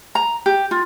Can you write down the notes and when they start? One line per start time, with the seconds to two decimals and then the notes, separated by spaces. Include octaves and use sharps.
0.15 A#5
0.46 G4
0.71 F4